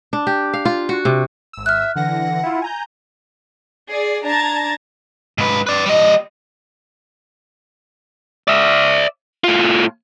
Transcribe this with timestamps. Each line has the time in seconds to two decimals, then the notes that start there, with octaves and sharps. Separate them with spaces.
0.13 D4
0.27 G4
0.54 F5
0.65 F4
0.89 F#4
1.05 C3
1.53 G#1 E6
1.66 E5 F6 F#6
1.96 D3 E3 F#5 A#6
2.44 E4 F4
2.62 G#5 A#5 G6
3.91 G#4 D5
4.26 D4 A5 A#5 G#6 A6
5.38 G#2 B4
5.67 B4 D5
5.86 G3 D#5
8.48 D5 E5
9.44 A2 F4